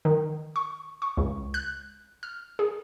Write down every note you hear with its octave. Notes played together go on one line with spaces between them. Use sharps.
D#3
C#6
C#6
C#2
F#6
F6
G#4